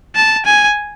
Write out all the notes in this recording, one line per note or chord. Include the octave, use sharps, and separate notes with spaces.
A5
G#5